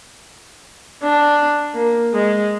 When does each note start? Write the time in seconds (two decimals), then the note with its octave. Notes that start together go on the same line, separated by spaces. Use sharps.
1.03 D4
1.74 A#3
2.13 G#3